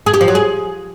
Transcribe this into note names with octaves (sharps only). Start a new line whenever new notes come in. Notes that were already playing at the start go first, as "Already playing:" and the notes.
G#4
G4
F3
F#3
G#4